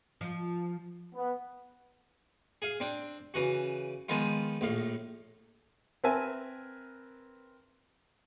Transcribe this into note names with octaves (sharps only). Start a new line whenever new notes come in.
F3
B3
G#4 F5
C4 D4
C#3 E3 F#4
D#3 F3 G#3 B3 F4
A#1 A2 F5
C4 A#4 B4 E5 G#5 A5